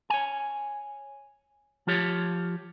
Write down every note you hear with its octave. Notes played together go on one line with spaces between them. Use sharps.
C#5 G#5
F3 F4 G4 C#5